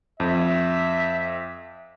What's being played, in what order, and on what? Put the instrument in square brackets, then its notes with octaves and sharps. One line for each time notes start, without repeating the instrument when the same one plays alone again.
[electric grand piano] F2 [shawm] E5